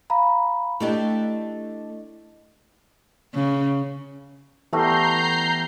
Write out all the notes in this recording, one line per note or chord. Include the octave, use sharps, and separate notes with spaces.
F5 A#5 B5
A3 D4 E4 G4 D#5
C#3
E3 G3 A3 B3 A#5 G6 C7